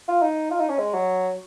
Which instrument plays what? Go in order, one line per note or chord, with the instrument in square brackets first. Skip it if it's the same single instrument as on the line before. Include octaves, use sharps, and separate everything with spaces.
[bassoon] F4
D#4
F4
D#4
C#4
G#3
F#3